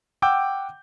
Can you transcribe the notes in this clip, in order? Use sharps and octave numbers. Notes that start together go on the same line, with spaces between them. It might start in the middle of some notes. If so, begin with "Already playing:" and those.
F#5 G5 D6 E6 G6